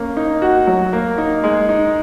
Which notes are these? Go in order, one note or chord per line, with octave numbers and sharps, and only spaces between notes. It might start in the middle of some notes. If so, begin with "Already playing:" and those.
Already playing: A#3 C#4
D#4
F#4
F#3
A#3
D#4
G#3
D#4